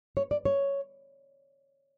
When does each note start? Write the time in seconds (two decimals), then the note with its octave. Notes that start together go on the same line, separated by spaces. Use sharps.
0.17 C#5
0.31 D5
0.45 C#5